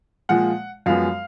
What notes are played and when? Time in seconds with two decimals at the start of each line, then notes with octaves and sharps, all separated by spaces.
0.29 A#2 F3 G#3 F#5
0.86 F#2 F3 G#3 B3 F5